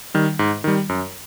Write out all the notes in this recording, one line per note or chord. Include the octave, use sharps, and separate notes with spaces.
D#3 G3
G#2
D#3 G3
F#2